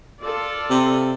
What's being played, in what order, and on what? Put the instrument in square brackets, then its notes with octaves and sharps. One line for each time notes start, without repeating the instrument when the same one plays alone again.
[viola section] F4 A4 D5
[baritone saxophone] C3